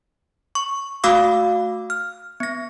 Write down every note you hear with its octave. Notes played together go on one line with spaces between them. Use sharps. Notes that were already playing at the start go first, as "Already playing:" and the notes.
C#6
A3 F#4 F5 D6 E6
F6
B3 A#6